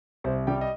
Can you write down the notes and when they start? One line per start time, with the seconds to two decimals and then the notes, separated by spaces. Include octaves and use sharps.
0.24 C2 C5
0.47 G3 G4 G5
0.61 D#5